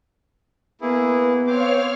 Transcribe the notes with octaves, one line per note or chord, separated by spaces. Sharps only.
A#3 B3 E4 G#4 B4
C4 C5 C#5 F5 D6 F6